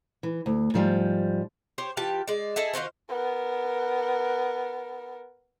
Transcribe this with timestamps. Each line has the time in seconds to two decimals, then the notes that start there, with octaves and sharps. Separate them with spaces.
0.23 E3
0.46 D2
0.74 G#2 F3 G3
1.78 G4 C5 C#5
1.97 E3 F4 G4 A5
2.27 G#3 D5
2.56 E4 G#4 A4 D#5
2.74 D#3 F4 F#4 C5
3.09 B3 A#4